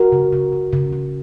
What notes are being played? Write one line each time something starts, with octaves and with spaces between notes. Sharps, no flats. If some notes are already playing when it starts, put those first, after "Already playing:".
Already playing: F#4 A#4
C#3
C#3
C#3
C#3
C#3